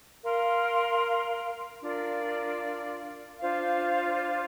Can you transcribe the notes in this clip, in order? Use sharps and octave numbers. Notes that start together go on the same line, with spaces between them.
A#4 F5 C6
D4 F4 A#4 D5
D4 F4 C5 F5